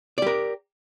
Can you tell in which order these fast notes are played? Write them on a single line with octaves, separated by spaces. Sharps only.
D5 G4 A#4